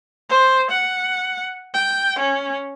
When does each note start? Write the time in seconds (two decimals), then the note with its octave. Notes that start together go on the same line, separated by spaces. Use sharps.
0.30 C5
0.71 F#5
1.74 G5
2.19 C#4